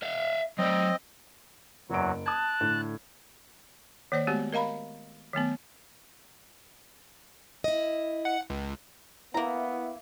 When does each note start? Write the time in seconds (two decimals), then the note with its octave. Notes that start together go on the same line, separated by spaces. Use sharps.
0.02 E5 F5
0.58 F#3 C4 D5 D#5
1.90 F#1 E2 F#3 D7
2.26 A5 D#6 F#6 G#6
2.61 A2 D3 A4
4.12 D#3 A#3 C5 D5
4.27 G#3 A3 B3 F#4 G4
4.53 A#4 D#5 F5 A#5 B5
5.33 D#3 F#3 A3 B3
7.64 E4 D#5
8.25 F#5
8.50 C#2
9.34 A#3 B3 E4 A#5